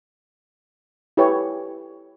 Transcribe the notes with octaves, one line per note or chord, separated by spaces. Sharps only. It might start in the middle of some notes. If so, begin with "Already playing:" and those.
E4 G4 A4 B4 C#5